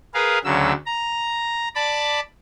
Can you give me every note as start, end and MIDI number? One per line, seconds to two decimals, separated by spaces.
0.14 0.39 68
0.14 0.39 70
0.14 0.39 71
0.14 0.39 77
0.45 0.73 38
0.45 0.73 49
0.45 0.73 54
0.45 0.73 88
0.86 1.68 82
1.75 2.20 74
1.75 2.20 81
1.75 2.20 83
1.75 2.20 86